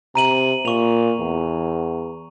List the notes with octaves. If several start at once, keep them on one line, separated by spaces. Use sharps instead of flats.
C3 A#5 D#7 F#7
A#2 C#6 F7
E2